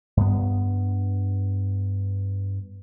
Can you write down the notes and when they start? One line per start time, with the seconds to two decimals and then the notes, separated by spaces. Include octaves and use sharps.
0.17 G2 B3